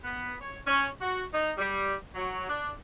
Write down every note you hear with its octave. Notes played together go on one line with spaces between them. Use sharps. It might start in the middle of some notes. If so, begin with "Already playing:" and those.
B3
C#5
C#4
F#4
D#4
G3
F#3
D4